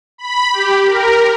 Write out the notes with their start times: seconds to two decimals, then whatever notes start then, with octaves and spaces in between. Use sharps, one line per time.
0.18 B5
0.53 G4
0.86 A#4